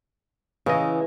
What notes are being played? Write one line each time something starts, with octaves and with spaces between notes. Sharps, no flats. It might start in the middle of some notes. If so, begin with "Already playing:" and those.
C#3 E3 D#5